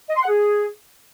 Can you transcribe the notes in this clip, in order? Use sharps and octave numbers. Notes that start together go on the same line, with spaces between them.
D#5
C6
F#5
G#4